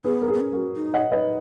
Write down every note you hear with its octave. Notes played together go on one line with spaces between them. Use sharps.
B3 G#4 B4
A#4
G#4
B3
C#4
F#4 A#4
D#4
D#5 F#5
D#4 B4 D#5